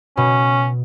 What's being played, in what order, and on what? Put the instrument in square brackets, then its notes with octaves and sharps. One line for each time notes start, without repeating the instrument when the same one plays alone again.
[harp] B2 [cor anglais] C#4